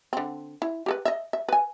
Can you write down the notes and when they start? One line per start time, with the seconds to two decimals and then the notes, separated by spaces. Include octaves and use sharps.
0.13 D3 C4
0.62 E4
0.86 G4 A4 B4
1.05 D#5 E5
1.33 E5
1.49 B4 G#5